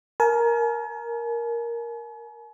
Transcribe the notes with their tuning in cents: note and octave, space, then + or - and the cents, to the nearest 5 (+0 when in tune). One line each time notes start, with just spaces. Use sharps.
A#4 +5 G#5 +45